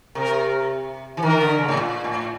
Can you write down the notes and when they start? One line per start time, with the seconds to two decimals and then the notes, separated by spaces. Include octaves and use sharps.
0.15 C3 A#4
1.17 E3
1.23 D#3 A#4
1.41 D3
1.58 C#3
1.68 A2
1.77 A#2
2.04 A2